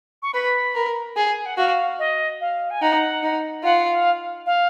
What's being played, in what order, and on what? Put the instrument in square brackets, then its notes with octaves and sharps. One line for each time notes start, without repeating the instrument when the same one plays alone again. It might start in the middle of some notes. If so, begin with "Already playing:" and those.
[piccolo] C#6
[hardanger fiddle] B4 [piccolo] B5
[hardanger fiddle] A#4
[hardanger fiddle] G#4 [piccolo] G#5
[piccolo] F#5
[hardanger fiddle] F#4 [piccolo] F5
[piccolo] D#5
F5
G#5
[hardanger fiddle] D#4 [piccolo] F#5
[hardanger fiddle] D#4
[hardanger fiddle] F4 [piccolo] F#5
[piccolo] F5
F5